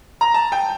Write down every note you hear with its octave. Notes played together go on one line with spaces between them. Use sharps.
A#5
A5
G5